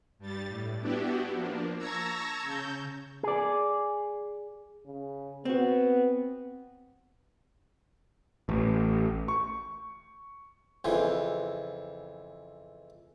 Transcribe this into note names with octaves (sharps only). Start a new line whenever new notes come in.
G2 G3 A6
A2
B3 D4 E4 F#4 G4
F3 A#3 D4
A5 A#5 C#6 E6 G#6 A#6
C#3 G6
G#4 D5
C#3
B3 C4 F#4
A1
C#6
F2 C#3 E3